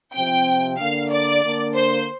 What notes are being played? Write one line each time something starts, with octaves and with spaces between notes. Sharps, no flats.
C3 F3 C4 G5
D3 A#3 D4 F5
D5
D3 A#3 D4
C5